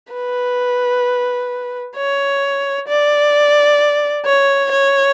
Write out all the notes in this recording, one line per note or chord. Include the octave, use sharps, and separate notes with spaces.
B4
C#5
D5
C#5
C#5